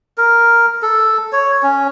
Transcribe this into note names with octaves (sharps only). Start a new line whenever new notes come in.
A#4
A4
C#5
C#4